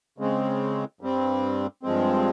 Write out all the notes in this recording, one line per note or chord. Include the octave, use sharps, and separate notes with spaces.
C#3 G#3 C4
G2 G3 C4
G2 F3 G#3 C4